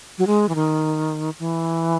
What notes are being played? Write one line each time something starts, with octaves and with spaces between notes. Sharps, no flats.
F#3
G#3
E3
D#3
E3